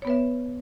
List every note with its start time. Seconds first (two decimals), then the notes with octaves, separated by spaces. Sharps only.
0.02 C#5
0.05 B3
0.07 B4
0.10 E5